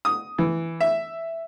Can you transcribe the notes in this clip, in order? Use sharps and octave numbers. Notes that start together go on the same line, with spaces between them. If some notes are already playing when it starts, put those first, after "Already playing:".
D#6
E3
E5